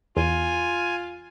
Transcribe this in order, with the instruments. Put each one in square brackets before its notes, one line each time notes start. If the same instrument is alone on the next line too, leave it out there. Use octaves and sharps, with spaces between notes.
[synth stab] E2 [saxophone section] F4 [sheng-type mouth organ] G#5